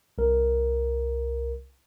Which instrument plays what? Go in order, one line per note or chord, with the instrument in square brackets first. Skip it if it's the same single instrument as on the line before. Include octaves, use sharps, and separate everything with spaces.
[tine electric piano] C2 A#4